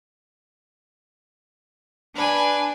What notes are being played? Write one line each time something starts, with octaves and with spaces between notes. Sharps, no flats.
D4 B4 G#5